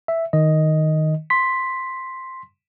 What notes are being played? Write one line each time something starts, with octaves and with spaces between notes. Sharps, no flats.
E5
D#3 D#5
C6 B6